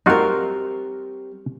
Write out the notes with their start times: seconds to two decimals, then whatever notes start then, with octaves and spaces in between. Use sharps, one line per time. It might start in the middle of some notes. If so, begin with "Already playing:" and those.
0.06 G3 C4 D#4 F4 F#4 A#4